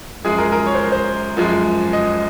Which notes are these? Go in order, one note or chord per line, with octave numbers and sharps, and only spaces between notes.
F#2 F3 G#3 G#4
A#4
A#4
C#5
C5
A#4
C5
F#2 F3 G#3
D#5